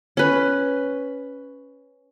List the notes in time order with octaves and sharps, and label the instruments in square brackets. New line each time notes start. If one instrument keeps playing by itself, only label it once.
[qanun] C#4 B4